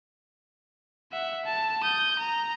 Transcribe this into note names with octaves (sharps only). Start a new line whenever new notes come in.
E5 F#5
A5
D#6 G6
A#5